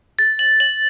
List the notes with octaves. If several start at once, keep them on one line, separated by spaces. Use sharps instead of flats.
A6
F#7
F#7